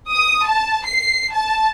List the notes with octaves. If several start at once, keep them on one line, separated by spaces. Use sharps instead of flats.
D#6
A5
C7
A5